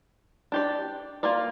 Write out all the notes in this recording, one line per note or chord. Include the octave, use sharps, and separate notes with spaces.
D4 G4 D5
A#3 F4 A#4 D5